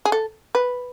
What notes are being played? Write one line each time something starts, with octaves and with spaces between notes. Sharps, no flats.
G#4
A4
B4